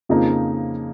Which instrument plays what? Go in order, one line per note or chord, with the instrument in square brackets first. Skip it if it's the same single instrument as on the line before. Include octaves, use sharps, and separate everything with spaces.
[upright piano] F2 C#3 F3 A#3 D#4